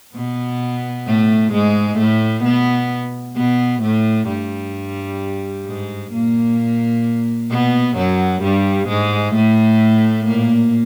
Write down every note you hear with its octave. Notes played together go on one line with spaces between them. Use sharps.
B2 B3
A2 A3
G#2 G#3
A2 A3
B2 B3
B2 B3
A2 A3
G2 G3
G#2 G#3
A#2 A#3
B2 B3
F#2 F#3
G2 G3
G#2 G#3
A2 A3
A#2 A#3